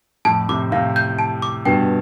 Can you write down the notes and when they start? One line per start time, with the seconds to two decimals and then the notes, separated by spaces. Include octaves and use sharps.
0.25 F2 A2 A5
0.49 A2 C3 D6
0.72 A2 C3 F5
0.96 G6
1.19 A5
1.42 D6
1.65 G2 B2 G5